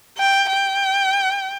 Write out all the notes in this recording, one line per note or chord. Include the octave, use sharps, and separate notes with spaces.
G5
G5